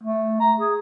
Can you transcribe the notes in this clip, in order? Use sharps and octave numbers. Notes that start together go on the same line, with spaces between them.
A3
A#5
G#4